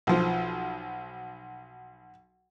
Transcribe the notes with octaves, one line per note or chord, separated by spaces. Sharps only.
B1 F3